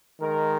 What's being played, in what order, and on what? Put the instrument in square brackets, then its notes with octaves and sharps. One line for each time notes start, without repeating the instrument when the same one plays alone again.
[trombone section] D#3 G#3 A#4